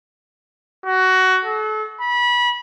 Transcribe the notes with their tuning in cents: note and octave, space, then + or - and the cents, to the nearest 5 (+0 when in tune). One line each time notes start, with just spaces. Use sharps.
F#4 +15
A4 -35
B5 -25